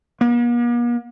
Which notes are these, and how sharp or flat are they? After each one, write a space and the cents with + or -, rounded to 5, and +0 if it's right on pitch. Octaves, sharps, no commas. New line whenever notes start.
A#3 +45